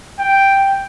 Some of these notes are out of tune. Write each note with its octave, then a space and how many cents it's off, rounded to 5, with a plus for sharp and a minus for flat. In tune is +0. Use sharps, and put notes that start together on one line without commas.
G5 +0